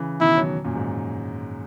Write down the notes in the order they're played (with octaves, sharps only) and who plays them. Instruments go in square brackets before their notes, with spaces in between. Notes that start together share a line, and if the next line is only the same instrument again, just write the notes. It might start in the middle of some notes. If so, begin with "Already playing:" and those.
Already playing: [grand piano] C#3 E3
[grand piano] B2 D#3 [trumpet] E4
[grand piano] D#3 F#3
F#2 A#2
G#2